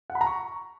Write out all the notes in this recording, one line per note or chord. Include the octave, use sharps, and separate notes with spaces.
F#5
B5
A#5
C#6